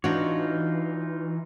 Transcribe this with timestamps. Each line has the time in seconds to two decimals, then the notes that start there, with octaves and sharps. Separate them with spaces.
0.04 E3 D4 D#4 F4 F#4 C#5